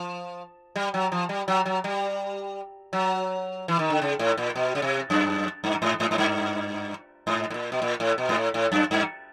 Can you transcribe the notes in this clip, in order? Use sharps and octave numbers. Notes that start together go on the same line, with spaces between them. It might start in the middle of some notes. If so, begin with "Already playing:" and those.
Already playing: F3
G3
F#3
F3
G3
F#3
F#3
G3
F#3
E3
D#3
D3
C#3
A2
A#2
B2
C#3
C3
F#2
G2
G#2
G#2
G#2
G2
G#2
A2
A#2
B2
A#2
A2
B2
G#2
A2
A2
F#2
G2